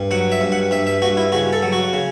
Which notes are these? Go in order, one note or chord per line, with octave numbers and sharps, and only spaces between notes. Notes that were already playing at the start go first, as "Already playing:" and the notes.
Already playing: G2
F#3 F#5
E5
G2
F#5
G2 E5
E5
G2 F#4
E4
C#3 F#4
A4
F#3
F#4
C#3